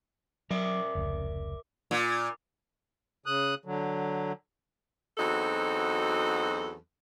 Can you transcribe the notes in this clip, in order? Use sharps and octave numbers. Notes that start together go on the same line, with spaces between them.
F#3 A#4 D5 E5
F1 C#2 C#4
A#2
C#3 D#6 F#6
D3 F#3
E2 F#3 C4 D#4 F#4 A4